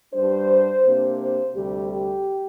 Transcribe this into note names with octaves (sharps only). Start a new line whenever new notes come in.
G2 G3 D4 C5
C3 A#3 D4
C5
D2 C3 G3 G4
G4